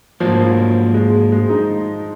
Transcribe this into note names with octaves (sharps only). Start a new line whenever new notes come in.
G#2 F3 F#3 A#3
G#3
G#3
D#4